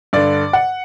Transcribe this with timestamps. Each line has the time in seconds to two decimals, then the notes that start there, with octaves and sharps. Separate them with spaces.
0.13 G2 D3 D5
0.53 F#5